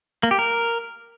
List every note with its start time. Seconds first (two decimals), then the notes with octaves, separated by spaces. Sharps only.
0.23 A#3
0.31 G4
0.39 A#4